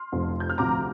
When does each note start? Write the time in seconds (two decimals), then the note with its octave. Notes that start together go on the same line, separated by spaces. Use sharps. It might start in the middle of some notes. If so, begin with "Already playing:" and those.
Already playing: C6 F6
0.12 F1 F2 C3 F3
0.40 G6
0.50 F6
0.58 D2 C3 F3 A#5 D6